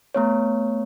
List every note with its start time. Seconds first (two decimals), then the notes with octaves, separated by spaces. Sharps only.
0.15 A3 B3 C#5